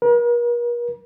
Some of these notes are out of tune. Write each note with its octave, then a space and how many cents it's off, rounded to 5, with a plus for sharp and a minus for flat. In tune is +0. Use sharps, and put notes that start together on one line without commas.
A#4 +45